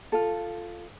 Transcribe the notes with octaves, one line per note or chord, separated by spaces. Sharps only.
F4 A4